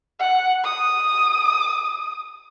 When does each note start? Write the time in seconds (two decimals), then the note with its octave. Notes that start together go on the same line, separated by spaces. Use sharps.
0.20 F#5
0.64 D#6